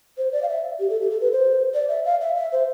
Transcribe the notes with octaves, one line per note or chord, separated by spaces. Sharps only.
C5
D5
F5
E5
G4
A4
G4
A4
B4
C5
D5
E5
F5
E5
E5
C5